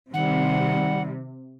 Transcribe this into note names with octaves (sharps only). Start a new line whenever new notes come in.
C3 D#3 G3 F#5